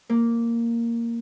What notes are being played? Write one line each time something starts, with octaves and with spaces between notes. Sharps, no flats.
A#3